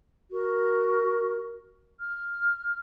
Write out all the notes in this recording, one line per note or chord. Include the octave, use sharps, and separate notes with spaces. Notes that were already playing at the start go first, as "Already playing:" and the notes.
F#4 A#4
F6